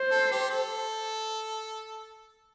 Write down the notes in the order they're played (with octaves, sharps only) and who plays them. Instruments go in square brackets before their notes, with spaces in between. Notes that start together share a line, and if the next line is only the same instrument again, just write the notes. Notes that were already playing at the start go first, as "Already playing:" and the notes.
Already playing: [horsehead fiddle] C5
[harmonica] A4
G4
A4